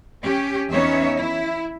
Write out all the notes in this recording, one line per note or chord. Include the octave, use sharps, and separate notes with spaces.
C#4 G4
E2 B3 C#4 D#4 C#5 E5
E4